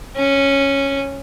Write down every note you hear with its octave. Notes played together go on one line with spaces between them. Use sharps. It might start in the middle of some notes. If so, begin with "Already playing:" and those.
C#4